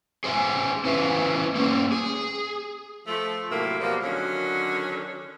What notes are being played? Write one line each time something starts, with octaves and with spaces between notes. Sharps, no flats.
G#4 C5 D5 E5 G#5
C#4 E4 B4 C5 E5
A#3 C#4 C5
G#4
F3 A3
A2 C3 F#3 A#3 E5
B2 F3 G3 A#3
D3 D#3 F#3 C#4